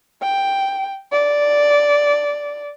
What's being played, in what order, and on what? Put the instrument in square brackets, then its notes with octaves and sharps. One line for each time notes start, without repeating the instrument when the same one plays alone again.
[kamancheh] G5
D5